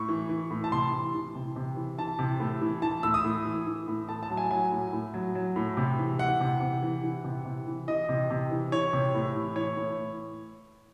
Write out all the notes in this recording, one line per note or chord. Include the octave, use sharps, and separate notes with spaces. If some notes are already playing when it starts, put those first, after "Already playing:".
Already playing: A2 C#6
E3
E3
A2
A5
C3 C6
E3
E3
C3
C3
E3
E3 A5
C3
A2
E3
E3 A5
A2 E6
D#6
A2
E3
E3
A2
A2 A5
A5
F#3
G#5
F#3 G#5
A2
A2
F#3
F#3
A2
C3
E3
E3 F#5
C3
C3
E3
E3
C3
C3
E3
E3 D#5
C3
C3
E3
E3 C#5
C3
A2
E3
E3 C#5
A2